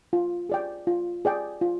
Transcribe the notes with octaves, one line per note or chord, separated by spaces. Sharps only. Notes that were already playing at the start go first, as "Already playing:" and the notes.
F4
G#4 D5 G5
F4
G#4 D5 G5
F4